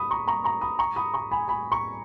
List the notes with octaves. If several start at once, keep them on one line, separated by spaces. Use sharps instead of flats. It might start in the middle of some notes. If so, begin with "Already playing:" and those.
Already playing: B5 D#6
A#5 C#6
A#5 C#6
A#5 C#6
B5 D#6
A#5 C#6
B5 D#6
A#5 C#6
G#5 B5
G#5 B5
A#5 C#6